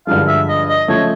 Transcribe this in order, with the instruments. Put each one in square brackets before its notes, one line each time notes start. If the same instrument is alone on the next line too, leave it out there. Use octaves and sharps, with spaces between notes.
[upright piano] G2 D3 F3 G#3 [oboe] F5
[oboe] E5
D#5
D#5
[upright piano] C#3 F3 A3 [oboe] C#5